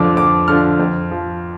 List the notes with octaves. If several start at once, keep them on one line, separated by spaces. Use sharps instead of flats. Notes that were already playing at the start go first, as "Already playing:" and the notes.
Already playing: F2 D3 F3 D6
F2 D6
D3 F3 F6
F2
F3